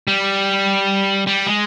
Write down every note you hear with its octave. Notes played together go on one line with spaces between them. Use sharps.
G3
G3
G#3